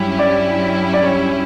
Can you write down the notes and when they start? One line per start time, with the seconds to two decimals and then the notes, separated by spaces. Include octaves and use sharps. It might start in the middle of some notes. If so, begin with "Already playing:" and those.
Already playing: G2 F#3 C#4 E4 G4
0.19 D5
0.93 D5
1.04 C#5